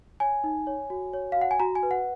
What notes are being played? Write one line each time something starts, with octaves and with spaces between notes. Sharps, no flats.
C#5 G#5
D#4
C#5
F#4
C#5
F5
F#4
F#5
G#5
F#4 A#5
G#5
B4
F#5